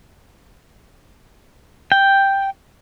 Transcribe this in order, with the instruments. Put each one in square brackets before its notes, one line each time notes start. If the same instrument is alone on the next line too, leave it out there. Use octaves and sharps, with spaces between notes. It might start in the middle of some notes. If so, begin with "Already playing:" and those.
[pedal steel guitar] G5